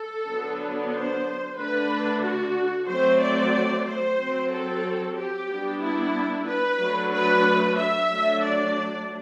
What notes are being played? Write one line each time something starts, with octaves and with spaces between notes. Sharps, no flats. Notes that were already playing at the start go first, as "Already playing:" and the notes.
Already playing: A4
D3 F#3 B3 D4
C5
D3 A3 D4 B4
F#4
F#3 A3 C4 C5
D5
C5
F#3 C4
A4
G4
G3 B3 D4
E4
B4
F#3 A3 D4
B4
E5
F#3 A3 D4
D5